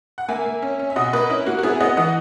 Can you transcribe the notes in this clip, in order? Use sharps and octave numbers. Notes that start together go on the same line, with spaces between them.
F#5
A#3 E5 G#5
A#3
C#4
C#4
E5
B2 D#5 F#5
A#3 B4 D#5
C#4 E4
A#3 F#4
F#4
B3 E4 G#4
B3 D#5 F#5
E3 D#5 F#5